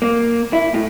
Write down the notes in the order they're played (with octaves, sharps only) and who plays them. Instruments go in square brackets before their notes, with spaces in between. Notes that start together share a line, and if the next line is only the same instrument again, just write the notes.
[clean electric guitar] A#3
E4
A2